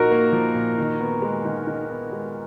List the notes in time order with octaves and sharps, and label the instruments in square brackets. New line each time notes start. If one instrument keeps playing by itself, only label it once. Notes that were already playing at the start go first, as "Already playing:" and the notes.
Already playing: [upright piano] A#2 F3 A#3 D#4 [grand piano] F#4 A#4
[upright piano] A#3
F3
A#2
D#3
B3
G#3
D#3
D#3
B3
G#3